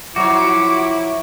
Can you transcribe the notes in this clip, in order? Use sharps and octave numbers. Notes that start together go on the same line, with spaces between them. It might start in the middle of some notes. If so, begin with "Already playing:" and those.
F3 F#3 E4 F#4 C#5 D6